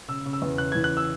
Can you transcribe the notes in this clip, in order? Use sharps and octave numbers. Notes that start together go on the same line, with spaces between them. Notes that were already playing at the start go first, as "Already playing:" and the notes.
C#3 E6
C#3
E6
E2
C#3 F#6
E3 G#6
F#6
E6